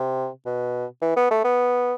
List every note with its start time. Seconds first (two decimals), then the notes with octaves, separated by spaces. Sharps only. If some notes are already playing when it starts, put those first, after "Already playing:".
Already playing: C3
0.46 B2
1.02 E3
1.17 B3
1.31 A3
1.44 B3